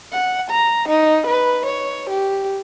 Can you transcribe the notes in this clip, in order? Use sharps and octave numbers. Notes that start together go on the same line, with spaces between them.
F#5
A#5
D#4
B4
C#5
G4